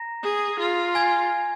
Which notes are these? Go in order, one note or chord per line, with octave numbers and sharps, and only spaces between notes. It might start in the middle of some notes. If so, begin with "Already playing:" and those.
Already playing: A#5 A#6
G#4
F4
G#5 G#6